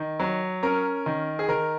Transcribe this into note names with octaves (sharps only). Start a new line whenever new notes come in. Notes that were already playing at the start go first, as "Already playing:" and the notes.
Already playing: D#3
F#3
C#4 A#4
D#3
G#4
D#3 A#4